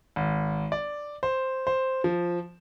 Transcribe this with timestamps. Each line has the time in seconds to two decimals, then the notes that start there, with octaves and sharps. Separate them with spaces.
0.16 G#1
0.72 D5
1.23 C5
1.67 C5
2.04 F3